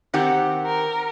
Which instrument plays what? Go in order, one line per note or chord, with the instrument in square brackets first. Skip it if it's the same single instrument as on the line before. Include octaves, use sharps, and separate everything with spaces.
[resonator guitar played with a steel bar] D#3 C4 G4 [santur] F#5
[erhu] A#4